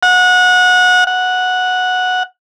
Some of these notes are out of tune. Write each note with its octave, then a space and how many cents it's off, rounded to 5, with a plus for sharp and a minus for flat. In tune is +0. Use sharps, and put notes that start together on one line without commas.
F#5 -25
F#5 -10